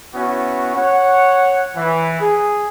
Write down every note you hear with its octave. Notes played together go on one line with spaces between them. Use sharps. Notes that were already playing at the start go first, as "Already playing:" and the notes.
B3 C#4 E4 F#4
C#5 F#5
E3
G#4